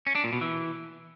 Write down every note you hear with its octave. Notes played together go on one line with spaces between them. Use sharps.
C#4
D4
A#2
B2
E3